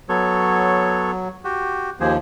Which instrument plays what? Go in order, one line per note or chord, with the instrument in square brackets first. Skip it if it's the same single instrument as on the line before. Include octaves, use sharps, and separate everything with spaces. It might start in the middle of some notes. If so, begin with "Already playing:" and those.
[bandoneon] F#3 [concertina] B3 A4 C#5
[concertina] F#4 G4
[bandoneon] D#2 F3 [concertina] G4 G#4 C5